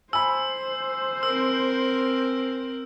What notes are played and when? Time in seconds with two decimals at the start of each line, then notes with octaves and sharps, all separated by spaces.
0.13 C5 G#5 B5 E6
1.23 C4 A#4 E6